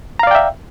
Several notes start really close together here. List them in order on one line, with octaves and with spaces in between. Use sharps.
A#5 F5 D5 G5 E5